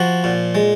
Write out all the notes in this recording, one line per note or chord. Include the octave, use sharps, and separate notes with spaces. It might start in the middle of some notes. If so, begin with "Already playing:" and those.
Already playing: F3 F#4
A#2
G#3